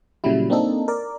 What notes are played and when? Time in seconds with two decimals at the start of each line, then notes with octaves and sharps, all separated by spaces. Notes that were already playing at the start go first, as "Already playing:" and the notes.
0.24 A#2 C#3 F#3 G3 E4
0.50 A#3 C4 D4 D#4 A4
0.88 A#4 D5